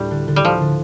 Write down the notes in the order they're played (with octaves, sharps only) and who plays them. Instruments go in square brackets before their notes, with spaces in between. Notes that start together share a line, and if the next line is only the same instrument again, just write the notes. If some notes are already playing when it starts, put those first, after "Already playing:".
Already playing: [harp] D2 A2 D4 [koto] G3
[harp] D3
D3
[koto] G3
[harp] D3 [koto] F3
[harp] D3